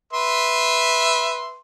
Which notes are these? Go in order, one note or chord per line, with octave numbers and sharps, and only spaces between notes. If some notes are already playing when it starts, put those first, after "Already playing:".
B4 E5 C6